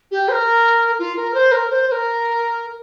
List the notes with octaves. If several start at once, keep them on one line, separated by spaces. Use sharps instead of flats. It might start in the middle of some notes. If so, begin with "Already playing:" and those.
G4
C5
A#4
F4
A#4
C5
A#4
C5
C5
A#4